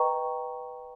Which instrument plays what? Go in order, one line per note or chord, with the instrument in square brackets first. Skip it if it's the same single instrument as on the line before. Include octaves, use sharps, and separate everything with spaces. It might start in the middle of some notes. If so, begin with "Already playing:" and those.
Already playing: [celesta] B4 D#5 G5 A#5 C#6